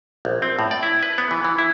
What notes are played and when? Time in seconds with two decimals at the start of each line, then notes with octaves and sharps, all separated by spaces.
0.25 A#1
0.42 C4
0.59 A2
0.71 D5
0.83 E4
1.03 B4
1.18 B3
1.31 E3
1.44 E3
1.58 E4